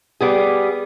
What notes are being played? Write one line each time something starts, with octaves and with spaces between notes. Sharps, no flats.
G3 B3 G#4